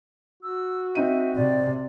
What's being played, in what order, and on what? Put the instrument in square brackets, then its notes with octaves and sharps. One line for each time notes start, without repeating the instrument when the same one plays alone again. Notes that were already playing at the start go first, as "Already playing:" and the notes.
[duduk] F#4 [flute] E6
[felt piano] C4 D#4 D#7 [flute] E5
[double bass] C3 [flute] D5